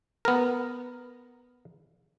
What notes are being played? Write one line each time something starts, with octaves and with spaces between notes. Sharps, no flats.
B3 A#4